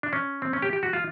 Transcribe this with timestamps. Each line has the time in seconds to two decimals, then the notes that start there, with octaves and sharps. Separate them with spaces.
0.03 D4
0.13 C#4
0.42 C4
0.53 C#4
0.62 G4
0.73 G4
0.83 F#4
0.93 F4